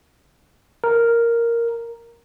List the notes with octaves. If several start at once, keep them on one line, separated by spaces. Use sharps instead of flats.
A#4